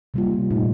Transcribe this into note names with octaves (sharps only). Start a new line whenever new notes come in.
C3 G3 A#3 F4
A#2 A3 D#4